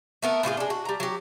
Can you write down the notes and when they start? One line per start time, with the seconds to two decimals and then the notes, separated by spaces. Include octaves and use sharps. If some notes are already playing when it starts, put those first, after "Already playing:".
0.22 A3 B3 A#4
0.43 A2 F4 F#4 G#4
0.57 G#3 D4
0.70 F#4
0.85 G3 A#5
1.00 F#3 G4